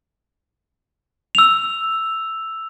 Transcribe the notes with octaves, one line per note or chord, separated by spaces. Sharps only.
E6 F7